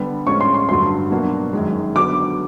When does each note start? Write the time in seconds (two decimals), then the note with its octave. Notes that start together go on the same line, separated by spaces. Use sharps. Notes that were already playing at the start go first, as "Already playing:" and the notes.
Already playing: D3 G3 B3
0.26 A2 F3 G#3 C#4 F4 C#6
0.41 C6
0.54 C6
0.69 G2 D3 F#3 A3 C6
1.11 B2 F#3 A#3 D4 F#4
1.53 F#2 D#3 G#3
1.95 D3 F#3 B3 D6